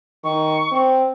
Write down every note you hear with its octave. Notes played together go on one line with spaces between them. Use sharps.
D#3 C#6
C4